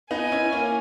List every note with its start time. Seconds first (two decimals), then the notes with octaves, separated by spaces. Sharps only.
0.10 B3 D#4 G#5
0.32 C#4 E4
0.52 A#3 C#4